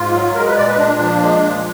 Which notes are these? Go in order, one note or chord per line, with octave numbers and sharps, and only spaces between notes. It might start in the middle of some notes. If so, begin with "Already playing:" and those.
Already playing: G#2 F4
F#3
G#3 A#4
B4
A#2 D5
B4
A#2 D4
F3
G#3
A#2